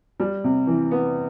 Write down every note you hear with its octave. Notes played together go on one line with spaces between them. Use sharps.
G3
C3
E3
B3